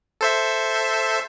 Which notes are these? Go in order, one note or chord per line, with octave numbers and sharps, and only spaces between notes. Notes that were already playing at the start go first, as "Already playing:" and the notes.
A4 C5 E5